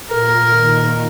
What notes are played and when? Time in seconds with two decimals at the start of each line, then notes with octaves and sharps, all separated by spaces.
0.10 A#2 A#4
0.47 D#3